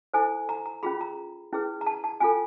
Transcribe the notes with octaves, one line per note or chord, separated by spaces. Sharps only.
E4 A4 C5 G#5
A#5
A#5
C#4 F4 G#4 B5
A#5
C#4 E4 G#4 B4
A#5
A5
A5
C#4 F4 A4 G#5